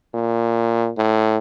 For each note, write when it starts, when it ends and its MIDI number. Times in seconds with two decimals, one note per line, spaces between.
0.14 0.91 46
0.97 1.39 45